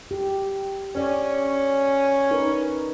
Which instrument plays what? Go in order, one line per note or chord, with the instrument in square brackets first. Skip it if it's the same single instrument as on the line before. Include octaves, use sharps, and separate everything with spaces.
[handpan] G4
[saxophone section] C#4 [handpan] C#5 D5
[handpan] D#4 A#4 B4